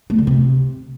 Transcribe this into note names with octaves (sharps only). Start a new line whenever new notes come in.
A3
D3
C3